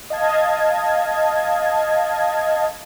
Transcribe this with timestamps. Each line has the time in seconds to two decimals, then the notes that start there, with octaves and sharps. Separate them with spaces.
0.10 D#5 F5 A5 G#6